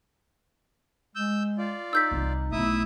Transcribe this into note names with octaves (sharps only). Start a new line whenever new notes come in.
G#3 E6 G6
F4 D5
D#4 E6 G6 B6
C2 D#3
B1 A3 E4 E5 D#6